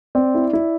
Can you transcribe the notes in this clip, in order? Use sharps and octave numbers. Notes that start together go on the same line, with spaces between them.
C4 D5
E4
E4